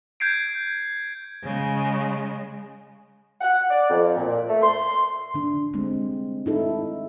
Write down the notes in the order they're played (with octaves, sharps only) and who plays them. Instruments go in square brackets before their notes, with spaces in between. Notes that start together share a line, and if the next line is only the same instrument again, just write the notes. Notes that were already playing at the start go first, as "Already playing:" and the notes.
[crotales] G6 G#6 C7 D7
[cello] C#3 G#3
[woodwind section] F#5
D5
F2
A#2
A3
C6
[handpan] D3 D4
G3 G#3 C4
D#4 E4 A4